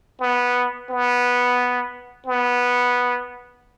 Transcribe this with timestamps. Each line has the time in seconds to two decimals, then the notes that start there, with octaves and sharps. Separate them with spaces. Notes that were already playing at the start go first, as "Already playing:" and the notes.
0.20 B3
0.90 B3
2.26 B3